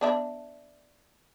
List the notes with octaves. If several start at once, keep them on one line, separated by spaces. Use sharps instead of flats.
B3 D4 E5